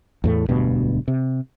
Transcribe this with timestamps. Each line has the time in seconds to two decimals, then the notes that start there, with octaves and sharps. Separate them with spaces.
0.24 E2 A2 A3
0.49 E1 D2 G2 B2
1.08 C3